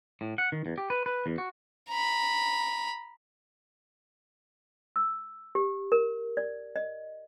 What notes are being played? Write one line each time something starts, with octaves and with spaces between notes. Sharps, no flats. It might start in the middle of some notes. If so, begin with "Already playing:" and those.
A2
F#5
D#3
E2
G4
B4
B4
E2
F#4
A#5 B5
E6
G4
A#4
D5
D#5